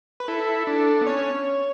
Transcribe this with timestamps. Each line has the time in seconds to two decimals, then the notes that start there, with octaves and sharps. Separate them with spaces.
0.20 B4
0.28 E4 A4
0.67 D4
1.01 B3
1.07 C#4 C#5